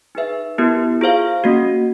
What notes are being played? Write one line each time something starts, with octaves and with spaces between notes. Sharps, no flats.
D#4 G#4 B4 E5
B3 E4 G4 A#4
F4 G#4 C5 F5
A#3 C#4 F#4